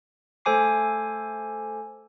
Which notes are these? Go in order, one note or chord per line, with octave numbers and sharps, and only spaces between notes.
A3 A4 C5 G#5 D6 C7